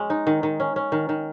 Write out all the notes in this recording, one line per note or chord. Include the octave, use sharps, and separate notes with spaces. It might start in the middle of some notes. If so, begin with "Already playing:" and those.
Already playing: G#3 C#4
D#4
D#3
D#3
C#4
C#4
D#3
D#3